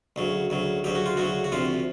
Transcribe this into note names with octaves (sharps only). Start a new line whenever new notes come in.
D2 C#3 F#3
D2 C#3 F#3
D2 C#3 F#3 G4
F#4
F4
D2 C#3 F#3 F#4
F#4
D2 C3 F3 F4